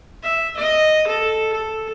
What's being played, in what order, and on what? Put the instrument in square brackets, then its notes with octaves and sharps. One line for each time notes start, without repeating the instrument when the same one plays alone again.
[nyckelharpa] E5
D#5
A4
A4